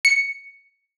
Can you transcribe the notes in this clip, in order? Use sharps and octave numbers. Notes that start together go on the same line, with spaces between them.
C#7